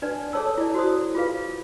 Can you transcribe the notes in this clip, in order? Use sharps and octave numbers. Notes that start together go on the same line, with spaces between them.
D4 D#4 B4 D5
G#4 A4 C#5 A5 E6
E4 D5
F#4 C5 D#6
F4 G#4 B4 F5